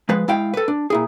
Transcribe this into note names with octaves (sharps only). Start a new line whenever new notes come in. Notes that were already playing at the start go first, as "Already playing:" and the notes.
F3 G#3 B4
G#3 E4 F5 G5
A4 B4
D4
A#2 E4 G#4